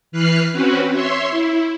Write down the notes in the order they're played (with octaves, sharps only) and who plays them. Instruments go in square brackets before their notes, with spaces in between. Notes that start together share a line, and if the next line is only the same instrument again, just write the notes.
[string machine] E3 B4 F6 F#6 C7
C4 C#4 F#4 B4
C#5 E5 C6
E4